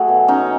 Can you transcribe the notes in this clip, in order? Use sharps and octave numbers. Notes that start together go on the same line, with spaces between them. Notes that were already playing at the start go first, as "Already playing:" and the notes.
Already playing: F#3 A3 F#4 G#4
B2
F#3 C#4 D#4